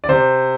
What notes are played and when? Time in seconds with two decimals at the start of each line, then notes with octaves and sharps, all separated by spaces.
0.04 D5
0.09 C3 C5